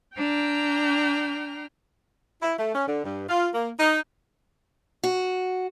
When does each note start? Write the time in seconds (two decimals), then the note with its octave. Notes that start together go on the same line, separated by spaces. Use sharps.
0.17 D4 G5 A#5 F6
2.42 E4
2.58 A3
2.74 C#4
2.87 D3
3.04 G2
3.28 F4
3.53 A#3
3.78 D#4
5.04 F#4